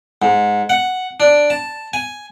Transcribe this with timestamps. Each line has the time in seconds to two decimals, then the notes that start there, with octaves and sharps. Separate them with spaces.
0.22 G#2
0.69 F#5
1.20 D4
1.50 A5
1.93 G#5